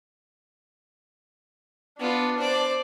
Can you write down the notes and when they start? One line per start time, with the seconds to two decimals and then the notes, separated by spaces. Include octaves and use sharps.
2.00 B3 D4 F4
2.37 C5 D5